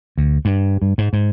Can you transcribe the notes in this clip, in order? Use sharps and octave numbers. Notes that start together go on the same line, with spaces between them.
D2
G2
G2
G#2
G#2